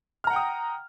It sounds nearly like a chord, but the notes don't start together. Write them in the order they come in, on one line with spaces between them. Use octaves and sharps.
F6 A#5 F#5 G5 D#6